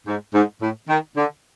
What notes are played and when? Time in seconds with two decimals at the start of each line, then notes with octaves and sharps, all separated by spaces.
0.07 G#2
0.34 G#2
0.61 A2
0.89 D#3
1.17 D3